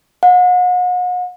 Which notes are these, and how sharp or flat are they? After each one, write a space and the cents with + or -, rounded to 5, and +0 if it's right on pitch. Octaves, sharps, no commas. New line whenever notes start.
F#5 -40